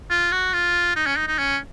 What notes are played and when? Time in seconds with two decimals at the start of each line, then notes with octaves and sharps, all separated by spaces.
0.10 F4
0.32 F#4
0.53 F4
0.96 D#4
1.07 C#4
1.16 D#4
1.27 D#4
1.38 C#4